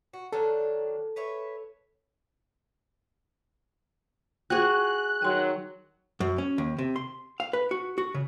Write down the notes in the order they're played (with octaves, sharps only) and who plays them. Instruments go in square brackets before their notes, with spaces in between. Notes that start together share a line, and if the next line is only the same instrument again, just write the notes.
[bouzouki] F#4
[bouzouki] D#3 F#3 D4 [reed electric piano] A4
[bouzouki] B4 C#5 E5
[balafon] F4 C5 G5 [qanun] F#4 G#4 [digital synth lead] F#6
[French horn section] D#3 F#3 [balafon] G5 C6
[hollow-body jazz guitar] F#2
C#4
D#2
C3
C6
F5
B4
F#4
F#4
C#3